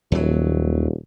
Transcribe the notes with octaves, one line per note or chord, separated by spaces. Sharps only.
D#1 D#2 F#3